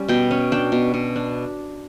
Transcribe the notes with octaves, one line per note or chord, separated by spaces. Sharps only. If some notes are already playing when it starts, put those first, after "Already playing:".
Already playing: G3 C#4
B2 G5
C#4
D4 G5
B2
B2
D4